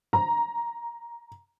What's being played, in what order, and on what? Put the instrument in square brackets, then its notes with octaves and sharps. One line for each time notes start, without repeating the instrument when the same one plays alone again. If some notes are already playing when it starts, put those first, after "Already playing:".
[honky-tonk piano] A#5